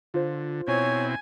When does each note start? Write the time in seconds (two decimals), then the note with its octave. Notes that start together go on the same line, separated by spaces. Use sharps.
0.14 D3 F4 C5
0.68 B2 C4 E4 C#5 G#5